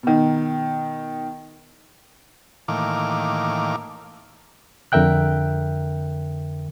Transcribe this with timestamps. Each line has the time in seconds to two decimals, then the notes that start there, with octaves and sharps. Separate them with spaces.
0.03 B2 D#3
2.68 A2 D#3 E3 A#3 F5 D6
4.92 F2 D3 A#4 E5 G5 F#6